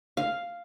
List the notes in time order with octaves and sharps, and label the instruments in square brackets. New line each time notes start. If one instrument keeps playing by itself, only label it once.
[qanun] F5